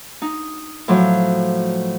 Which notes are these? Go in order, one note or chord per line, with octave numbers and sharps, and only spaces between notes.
D#4
A2 F3 F#3